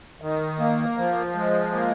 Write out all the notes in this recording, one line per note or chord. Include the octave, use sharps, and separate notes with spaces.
D#3
A#3
F3
G#3
A#3